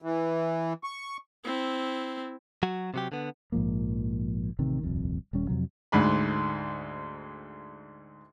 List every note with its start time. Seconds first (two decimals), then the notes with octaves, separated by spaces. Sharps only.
0.02 E3
0.84 C#6
1.45 C4 E4
2.63 F#3 F#4
2.94 C3 F#3 G4
3.12 D3 B3
3.52 A#1 G#2 F3 A#3
4.59 A1 C3 D#3
4.83 D#1 C2 F2
5.33 D#1 G3 C#4
5.48 F2 A2 C3 F#3
5.92 D2 G#2 B5